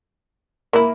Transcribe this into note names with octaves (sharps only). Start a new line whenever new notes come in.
E3 A#3 E4